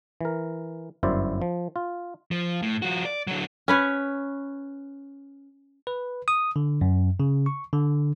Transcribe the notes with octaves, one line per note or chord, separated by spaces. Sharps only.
E3 A#4
G1 F#2 E4 C5 D5
F3
F4
F3
A2
F3 F#4
D5
D3 F#3
C#4 B4 C#5
B4
D#6
D3
F#2
C#3
C#6
D3